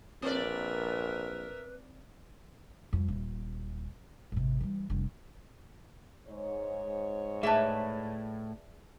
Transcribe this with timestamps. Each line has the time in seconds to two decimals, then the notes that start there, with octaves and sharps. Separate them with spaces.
0.22 A#1 C4 A#4 B4 D5 E5
2.93 F2 G3
3.08 D#1
4.32 G#1 C3
4.61 E3 G3
4.90 F1 G2
6.28 G#2 C#5
7.43 A2 G#4 B4 D5 E5 A5